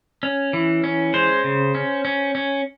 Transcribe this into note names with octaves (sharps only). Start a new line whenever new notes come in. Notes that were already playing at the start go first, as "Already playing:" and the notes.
C#4
E3
C#4
G#3 C5
C#3
C#4
C#4
C#4